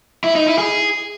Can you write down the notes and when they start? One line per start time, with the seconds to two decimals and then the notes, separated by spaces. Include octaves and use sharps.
0.24 E4
0.35 D#4
0.47 E4
0.58 G#4